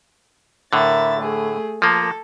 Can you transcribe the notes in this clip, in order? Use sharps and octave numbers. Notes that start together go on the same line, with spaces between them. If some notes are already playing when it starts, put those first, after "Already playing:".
A2 D3 A#4 E5 A6
A3 G#4
F3 A#3 A4